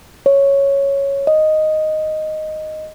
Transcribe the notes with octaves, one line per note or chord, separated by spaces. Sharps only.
C#5
D#5